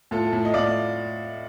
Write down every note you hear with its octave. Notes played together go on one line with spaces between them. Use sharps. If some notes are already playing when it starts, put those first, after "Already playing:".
A2 F4 A4
A2
D#5
A2 D5 F5